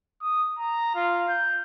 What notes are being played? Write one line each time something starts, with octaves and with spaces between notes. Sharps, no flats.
D#6
A#5
F4
G6